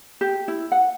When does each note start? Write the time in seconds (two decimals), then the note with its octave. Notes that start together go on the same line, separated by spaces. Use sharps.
0.21 G4
0.48 E4
0.72 F#5